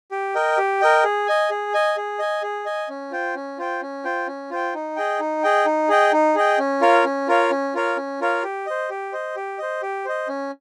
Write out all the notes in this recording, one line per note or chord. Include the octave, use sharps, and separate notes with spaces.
G4
A#4 D#5 G5
G4
A#4 D#5 G5
G#4
D#5 G#5
G#4
D#5 G#5
G#4
D#5 G#5
G#4
D#5 G#5
C#4
F4 C5 G5
C#4
F4 C5 G5
C#4
F4 C5 G5
C#4
F4 C5 G5
D#4
G#4 D#5 G5
D#4
G#4 D#5 G5
D#4
G#4 D#5 G5
D#4
G#4 D#5 G5
C#4
F4 A#4 C#5 F5
C#4
F4 A#4 C#5 F5
C#4
F4 A#4 C#5 F5
C#4
F4 A#4 C#5 F5
G4
C5 D#5
G4
C5 D#5
G4
C5 D#5
G4
C5 D#5
C#4